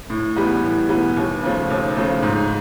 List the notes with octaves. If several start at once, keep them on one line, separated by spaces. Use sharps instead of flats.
A2
E3 G3 B3
A2
E3 G3 B3
D#2
C#3 F3 A3
D#2
C#3 F3 A3
G#2